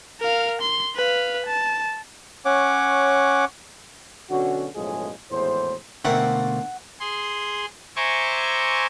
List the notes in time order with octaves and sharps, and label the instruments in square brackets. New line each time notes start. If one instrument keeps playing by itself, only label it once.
[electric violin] A#4 F5
C6
B4 F5
A5
[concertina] C#4 C#5 F#5 D6
[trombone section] B1 D3 C#4 F#4
B1 F#2 A2 F3 G#3 G#4
G#1 E2 A2 C5
[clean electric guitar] B2 D3 [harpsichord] A3 A#3 C4 [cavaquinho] F#5
[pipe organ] G#4 C6
C5 E5 G#5 A#5 C#6 D6